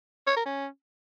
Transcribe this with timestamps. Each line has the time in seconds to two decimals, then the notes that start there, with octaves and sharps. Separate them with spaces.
0.27 C#5
0.36 A#4
0.45 C#4